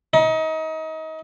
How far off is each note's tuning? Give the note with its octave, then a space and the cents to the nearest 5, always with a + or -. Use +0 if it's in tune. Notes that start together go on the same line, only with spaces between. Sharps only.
D#4 +30